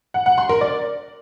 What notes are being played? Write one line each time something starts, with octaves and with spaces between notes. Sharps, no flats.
F#5
F#5
C6
A#4
D5